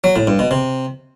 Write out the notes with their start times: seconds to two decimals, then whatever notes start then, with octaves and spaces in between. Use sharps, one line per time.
0.04 F#3
0.16 A2
0.27 G2
0.39 B2
0.51 C3